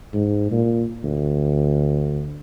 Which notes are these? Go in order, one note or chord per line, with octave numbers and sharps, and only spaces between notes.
G#2
A#2
D2